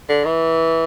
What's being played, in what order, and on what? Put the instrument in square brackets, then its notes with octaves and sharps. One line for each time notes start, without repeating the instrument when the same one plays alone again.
[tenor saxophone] D3
E3